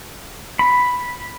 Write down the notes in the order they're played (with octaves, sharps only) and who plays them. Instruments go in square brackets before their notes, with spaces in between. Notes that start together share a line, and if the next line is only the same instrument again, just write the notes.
[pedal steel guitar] B5